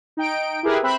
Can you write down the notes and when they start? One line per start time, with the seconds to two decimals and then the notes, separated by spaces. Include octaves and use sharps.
0.17 D#4 G5 D7
0.63 E4 G4 G#4 A#4 B4
0.83 C4 E5 B5 F#6